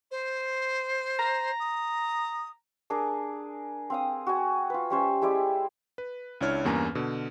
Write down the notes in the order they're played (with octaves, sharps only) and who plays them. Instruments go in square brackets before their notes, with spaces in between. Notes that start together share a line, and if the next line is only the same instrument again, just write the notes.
[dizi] C5
[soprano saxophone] A#5
[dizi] D#6
[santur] D4 G#4 A#4 D6
C4 F5 D#6
F#4 G#5
F4 B4
G3 C#4 C5 E5
G#3 E4 G4 D5
[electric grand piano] B4
C#2 D4 E4 C#5 F6
E2 G2 A#3 C#4 G#5 A#5
B2 D3